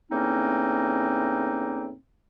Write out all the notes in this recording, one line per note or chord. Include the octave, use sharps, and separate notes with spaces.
E2 A2 A#3 C4 C#4 D#4